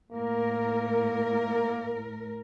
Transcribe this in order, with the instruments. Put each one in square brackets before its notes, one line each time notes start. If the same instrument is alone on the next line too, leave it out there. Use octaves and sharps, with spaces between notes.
[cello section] A2 A#4 [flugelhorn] A#3